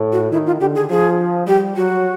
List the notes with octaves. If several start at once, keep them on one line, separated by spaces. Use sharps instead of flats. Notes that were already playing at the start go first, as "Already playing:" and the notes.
Already playing: A2
F#4
D#3 E4
F4
D3 G4
G#4
F3 G#4
G3 G4
F#3 F#4